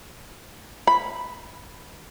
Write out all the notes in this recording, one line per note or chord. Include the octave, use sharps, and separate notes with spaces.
B5